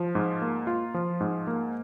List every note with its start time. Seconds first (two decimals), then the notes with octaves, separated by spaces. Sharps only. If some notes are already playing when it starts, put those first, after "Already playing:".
Already playing: F3
0.15 G#2
0.42 A#3
0.67 F4
0.94 F3
1.21 G#2
1.47 A#3